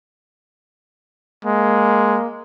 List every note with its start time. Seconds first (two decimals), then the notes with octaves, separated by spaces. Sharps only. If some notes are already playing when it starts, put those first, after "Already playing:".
1.45 G#3 A#3